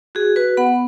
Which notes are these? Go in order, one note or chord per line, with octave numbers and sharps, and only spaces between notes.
F#4 G#4
F#4 B4
B3 F#5 B5